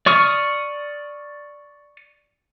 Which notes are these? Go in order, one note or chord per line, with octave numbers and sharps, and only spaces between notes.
D5 C#6 D#6 F6